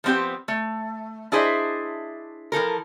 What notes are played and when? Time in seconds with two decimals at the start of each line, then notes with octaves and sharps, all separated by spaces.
0.04 F3 B3 C4 D#4 G4
0.48 A3
1.32 D4 E4 G#4 C5 D#5 E5
2.52 E3 F3 A4 A#4